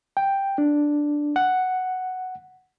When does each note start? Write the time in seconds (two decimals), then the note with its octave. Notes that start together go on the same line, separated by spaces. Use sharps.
0.17 G5
0.58 D4
1.36 F#5